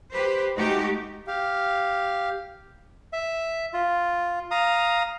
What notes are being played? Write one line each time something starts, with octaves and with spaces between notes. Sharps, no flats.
G4 B4 C5
G#3 A3 D#4 F#4 G4
G4 F5
E5
F4
F5 A#5 D#6